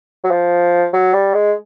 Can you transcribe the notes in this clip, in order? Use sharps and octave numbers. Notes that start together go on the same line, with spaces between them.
F#3
F3
F#3
G3
G#3